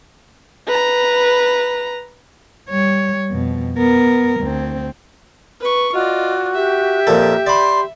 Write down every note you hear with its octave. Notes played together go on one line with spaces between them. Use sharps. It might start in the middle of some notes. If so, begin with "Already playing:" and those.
B4 A#5
G3 C#5
F2 B2
B3 A#4
D2 C4
B4 C#6
F4 F#4 D5 D#5
G4 E5
F2 A#2 A4 A#4
D5 B5 C6